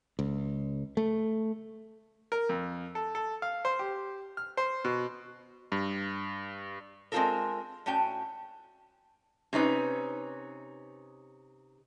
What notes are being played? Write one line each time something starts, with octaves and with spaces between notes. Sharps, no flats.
C#2
A3
A#4
F2
A4
A4
F5
C5
G4
F6
C5
B2
G2
G#3 C4 E4 F4 A4 A#4
A2 A3 C#4 F#4 G5
C3 C#4 D#4 B4